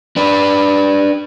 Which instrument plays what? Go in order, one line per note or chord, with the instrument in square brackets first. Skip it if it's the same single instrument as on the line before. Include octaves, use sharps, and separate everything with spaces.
[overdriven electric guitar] D4 B4